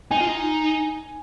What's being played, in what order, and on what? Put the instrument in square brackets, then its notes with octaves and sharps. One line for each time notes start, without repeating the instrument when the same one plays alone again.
[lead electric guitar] D#4 [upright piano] G#5
[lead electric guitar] F4
D#4